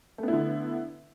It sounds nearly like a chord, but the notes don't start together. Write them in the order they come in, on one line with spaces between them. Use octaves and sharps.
A3 B3 E4 D3